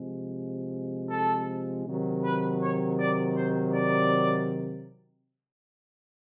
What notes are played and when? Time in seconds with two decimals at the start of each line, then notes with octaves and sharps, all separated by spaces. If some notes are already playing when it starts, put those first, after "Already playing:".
Already playing: C3 F3 G#3
1.10 A4
1.85 C3 D#3 F#3
2.24 B4
2.61 C#5
2.99 D5
3.36 C5
3.74 D5